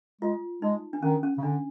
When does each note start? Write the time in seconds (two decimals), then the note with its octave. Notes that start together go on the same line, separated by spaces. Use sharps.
0.21 G#3 F4
0.62 G#3 D#4
0.93 D4
1.03 D#3 C#4
1.23 C#4
1.38 C#3
1.43 D3 D4